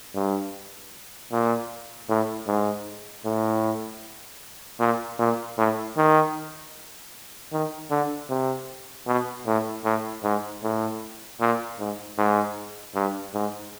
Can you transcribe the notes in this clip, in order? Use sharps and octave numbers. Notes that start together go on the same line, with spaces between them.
G2
A#2
A2
G#2
A2
A#2
A#2
A2
D#3
D#3
D3
C3
B2
A2
A2
G#2
A2
A#2
G#2
G#2
G2
G#2